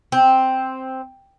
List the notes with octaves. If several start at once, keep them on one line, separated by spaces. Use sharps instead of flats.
C4